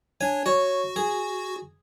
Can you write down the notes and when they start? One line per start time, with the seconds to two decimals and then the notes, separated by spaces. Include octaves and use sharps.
0.21 D4 C#5 G#5
0.46 F#4 C#5
0.96 G#4